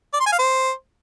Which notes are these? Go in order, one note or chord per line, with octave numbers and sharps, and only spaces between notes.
D5
C6
G#5
F5
C5